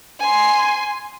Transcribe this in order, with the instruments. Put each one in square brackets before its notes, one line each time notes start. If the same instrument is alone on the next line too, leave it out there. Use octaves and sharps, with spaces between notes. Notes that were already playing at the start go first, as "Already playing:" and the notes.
[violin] G#5 C6